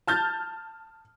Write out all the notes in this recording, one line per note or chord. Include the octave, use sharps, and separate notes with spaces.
A5 F6 G6 A6